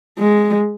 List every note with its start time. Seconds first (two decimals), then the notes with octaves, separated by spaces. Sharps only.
0.19 G#3